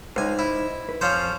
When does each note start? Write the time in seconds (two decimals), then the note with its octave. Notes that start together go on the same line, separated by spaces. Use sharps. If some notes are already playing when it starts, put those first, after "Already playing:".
0.16 C#2 D#4 C5 G#5
0.39 E4
0.89 B4
1.01 F2 F3 C#4 C5